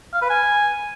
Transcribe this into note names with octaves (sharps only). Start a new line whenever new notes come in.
F5
B4
G#5